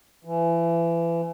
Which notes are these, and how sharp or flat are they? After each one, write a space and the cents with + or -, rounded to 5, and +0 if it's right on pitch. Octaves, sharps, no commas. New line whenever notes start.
E3 +30